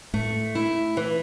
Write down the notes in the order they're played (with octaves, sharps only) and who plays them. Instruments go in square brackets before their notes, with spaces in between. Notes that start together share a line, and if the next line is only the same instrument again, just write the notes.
[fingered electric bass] A2 [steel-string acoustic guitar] A3
[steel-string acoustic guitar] E4
E3